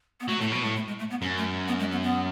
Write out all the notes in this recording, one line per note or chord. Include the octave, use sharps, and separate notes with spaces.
B3
F#3 A3
A2 A3
B2 F#3
A2 G#3
A3
G#3
A3
B3
F#2 C#4
A3
B3
G#3
B3
B3